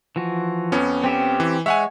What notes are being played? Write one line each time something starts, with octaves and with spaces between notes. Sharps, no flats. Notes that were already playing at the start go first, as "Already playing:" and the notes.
E3 F3 F#4
F2 B3 C#4
C4 G4 E5
E3
G#3 C#5 E5 F#5 G#5